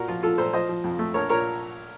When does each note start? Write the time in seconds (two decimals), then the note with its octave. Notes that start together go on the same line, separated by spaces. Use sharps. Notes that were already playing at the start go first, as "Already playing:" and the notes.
Already playing: A#2 F#4 A#4
0.08 F3 F4
0.23 F3 F4 A4
0.38 A#2 A4 C5
0.53 F3 C5 D#5
0.69 F3
0.84 F2
0.99 A3
1.14 A#1 A#4 C#5
1.29 A#2 A#4 C#5